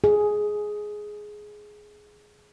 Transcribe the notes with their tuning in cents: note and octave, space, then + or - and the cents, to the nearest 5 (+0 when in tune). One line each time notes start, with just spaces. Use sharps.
G#4 +10